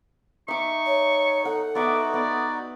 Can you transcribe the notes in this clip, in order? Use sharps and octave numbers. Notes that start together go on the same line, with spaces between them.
D#4 E5 C#6 D6
C#5
A4 F#5
B3 D#4 F#4 D5 E5 F#5
B3 D5